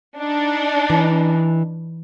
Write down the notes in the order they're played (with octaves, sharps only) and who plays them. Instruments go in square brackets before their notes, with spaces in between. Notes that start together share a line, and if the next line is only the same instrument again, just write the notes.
[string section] D4 D#4
[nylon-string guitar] E3